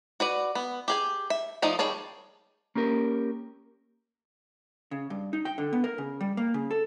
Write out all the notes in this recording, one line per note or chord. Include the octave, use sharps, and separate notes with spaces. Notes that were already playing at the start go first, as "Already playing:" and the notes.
F#4 B4 D5
B3
G4 G#4 G#5
E5
F3 A3 D#4 D5
D#3 G3 G#4 C#5 A5
A#3 C#4 G4 A#4
C#3
G2
D#4
G5
D3
B3
A#4
C#3
G3
A#3
C#3
A4